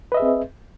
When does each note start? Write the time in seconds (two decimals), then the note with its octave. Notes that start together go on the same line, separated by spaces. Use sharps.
0.12 B4
0.14 D#5
0.17 E5
0.20 G#4
0.22 C4